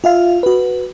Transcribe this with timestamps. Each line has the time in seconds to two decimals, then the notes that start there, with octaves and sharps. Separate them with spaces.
0.04 F4 E5 F5
0.43 F#4 B4